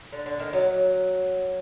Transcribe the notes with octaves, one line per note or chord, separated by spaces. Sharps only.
D3
D3
D#3
F#3